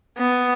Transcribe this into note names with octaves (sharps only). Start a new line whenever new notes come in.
B3